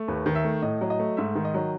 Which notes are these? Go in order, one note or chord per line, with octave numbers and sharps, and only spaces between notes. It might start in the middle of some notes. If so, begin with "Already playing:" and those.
Already playing: A3
D#2 B4
D#3
E5
A3
A2 D#5
F#3
D#5
A3
G#2 E5
D#3
D#5
F#3